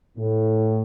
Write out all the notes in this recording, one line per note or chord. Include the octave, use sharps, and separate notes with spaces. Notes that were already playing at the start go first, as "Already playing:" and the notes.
A2